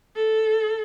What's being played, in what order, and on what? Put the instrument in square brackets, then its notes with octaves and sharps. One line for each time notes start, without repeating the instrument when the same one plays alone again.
[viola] A4